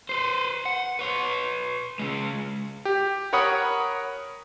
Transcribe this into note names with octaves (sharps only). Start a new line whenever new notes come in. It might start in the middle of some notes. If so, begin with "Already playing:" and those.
B4 C5
F#5
B4 C#5
C#3 G#3
G4
A#4 C#5 F#5 B5 D#6